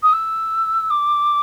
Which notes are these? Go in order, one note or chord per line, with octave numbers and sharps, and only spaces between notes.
D#6
E6
D6